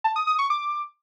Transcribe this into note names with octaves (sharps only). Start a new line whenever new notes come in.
A5
D#6
D#6
C#6
D6